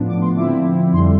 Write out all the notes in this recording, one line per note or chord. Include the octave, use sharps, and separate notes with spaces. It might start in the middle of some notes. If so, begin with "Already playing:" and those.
Already playing: A2 F3 B3 D4
D6
C6
D3 F3 C4 E4 D6
F2 D3 G3 C6